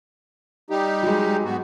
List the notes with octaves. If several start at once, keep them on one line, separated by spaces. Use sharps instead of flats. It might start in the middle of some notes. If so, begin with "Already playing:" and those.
G3 D#4 G4
F#3 G#3
G#2 B3 F#4